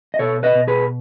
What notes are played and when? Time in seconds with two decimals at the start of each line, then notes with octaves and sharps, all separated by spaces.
0.14 D#5
0.19 B2 A4 C#5
0.43 B4 D#5
0.55 B2
0.67 G#4 B4